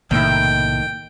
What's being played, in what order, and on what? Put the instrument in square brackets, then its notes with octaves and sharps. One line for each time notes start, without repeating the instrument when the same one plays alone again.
[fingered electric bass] B1 C3 A#3 [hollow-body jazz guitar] A2 E4 [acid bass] D#3 [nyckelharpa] G5